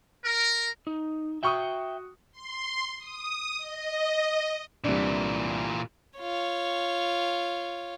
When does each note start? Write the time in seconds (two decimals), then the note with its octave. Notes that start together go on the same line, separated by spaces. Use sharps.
0.24 A#4
0.87 D#4
1.43 F#4 E5 G5 C#6 D#6
2.32 C6
2.98 D#6
3.57 D#5
4.84 C2 A#2 E3 D4
6.19 F4 C#5